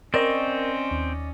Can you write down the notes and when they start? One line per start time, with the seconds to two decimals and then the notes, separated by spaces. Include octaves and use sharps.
0.14 C4 C#4 A#4 D5 D#5 C#6
0.91 D#2